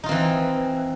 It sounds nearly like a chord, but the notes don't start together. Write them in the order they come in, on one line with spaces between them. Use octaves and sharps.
D#4 F4 C4 E3